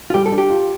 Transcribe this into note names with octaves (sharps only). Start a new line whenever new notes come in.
F4
G3 G4
A4
D4
G4
F4